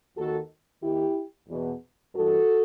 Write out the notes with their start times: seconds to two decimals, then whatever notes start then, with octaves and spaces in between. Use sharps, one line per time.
0.17 D#2 D#3 F#4 A4
0.83 D#2 D#3 E4 G4
1.49 E2 B2
2.14 G2 E3 F#4 A4